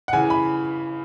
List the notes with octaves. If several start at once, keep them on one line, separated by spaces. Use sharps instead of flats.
F#5
C#3 E3 G#5
B5